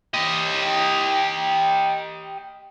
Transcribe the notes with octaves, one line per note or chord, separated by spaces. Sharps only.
G4 D#5